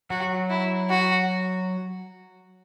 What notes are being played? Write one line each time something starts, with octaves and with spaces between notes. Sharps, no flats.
F#3 F#4
E4
F#4